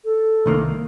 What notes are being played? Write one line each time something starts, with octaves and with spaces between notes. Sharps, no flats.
A4
C2 D#3 A#3